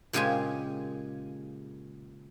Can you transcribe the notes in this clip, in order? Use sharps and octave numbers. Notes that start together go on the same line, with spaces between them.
A#2 C#3 G#3 G4 G#4 G#5